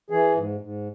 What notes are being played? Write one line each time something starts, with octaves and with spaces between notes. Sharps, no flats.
E3 G#4
G#2
G#2